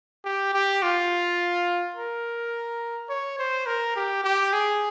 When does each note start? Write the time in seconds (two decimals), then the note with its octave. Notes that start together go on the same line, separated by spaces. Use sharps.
0.25 G4
0.54 G4
0.83 F4
1.96 A#4
3.10 C#5
3.39 C5
3.67 A#4
3.96 G4
4.24 G4
4.53 G#4